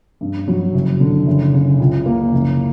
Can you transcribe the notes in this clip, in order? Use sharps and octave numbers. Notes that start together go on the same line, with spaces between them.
G2
F#3
F#1
D3
F#1
C#3
C#2
A#3
F#1